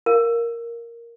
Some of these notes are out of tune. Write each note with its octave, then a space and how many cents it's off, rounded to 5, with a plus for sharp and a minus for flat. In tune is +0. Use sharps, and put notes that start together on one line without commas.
A#4 +0 F5 +0